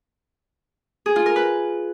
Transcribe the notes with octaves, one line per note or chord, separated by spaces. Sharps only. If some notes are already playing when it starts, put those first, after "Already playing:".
G#4
F4
A#4
B4